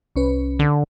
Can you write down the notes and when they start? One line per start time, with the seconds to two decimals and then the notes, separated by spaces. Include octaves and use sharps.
0.16 C2 C#4 B4
0.59 D3